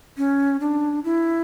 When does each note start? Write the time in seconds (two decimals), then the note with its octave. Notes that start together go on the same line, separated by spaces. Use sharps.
0.18 C#4
0.60 D4
1.04 E4